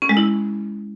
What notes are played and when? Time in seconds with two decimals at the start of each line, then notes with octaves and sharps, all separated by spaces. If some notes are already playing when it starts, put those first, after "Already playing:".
0.02 C#4
0.09 G#3
0.17 E4